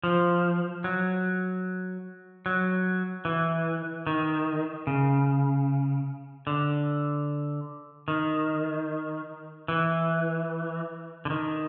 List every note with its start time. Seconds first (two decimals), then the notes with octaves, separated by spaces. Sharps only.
0.03 F3
0.84 F#3
2.46 F#3
3.25 E3
4.07 D#3
4.87 C#3
6.47 D3
8.08 D#3
9.68 E3
11.25 D3
11.30 D#3